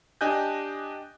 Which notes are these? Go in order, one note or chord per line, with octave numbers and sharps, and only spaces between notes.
D4 G4 D#5 G#5 F#6 G6